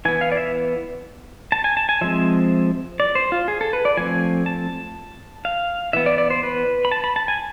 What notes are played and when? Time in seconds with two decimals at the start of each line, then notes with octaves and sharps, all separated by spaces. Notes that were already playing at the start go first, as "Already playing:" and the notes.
0.05 E3 B3 G#5
0.21 F5
0.32 D5
0.37 E5
1.52 A5
1.64 G#5
1.77 A5
1.89 G#5
2.01 F3 G#3 C4 E5
3.00 D5
3.15 C5
3.32 F4
3.48 G#4
3.61 A4
3.73 B4
3.85 D5
3.97 F3 A3 C4 G#5
4.46 A5
5.45 F5
5.93 E3 B3 E5
6.06 D5
6.18 D5
6.30 C5
6.43 B4
6.85 B5
6.92 A5
7.04 B5
7.16 A5
7.28 G#5